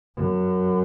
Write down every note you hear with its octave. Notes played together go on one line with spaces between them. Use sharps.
F#2